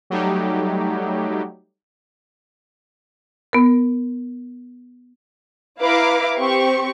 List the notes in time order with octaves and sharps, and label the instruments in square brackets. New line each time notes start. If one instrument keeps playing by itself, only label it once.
[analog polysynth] F#3 G3 A3 D#4 G4
[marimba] B3 A#4
[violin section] E4 B4 F5 A#5 D6
C4 G4 C#6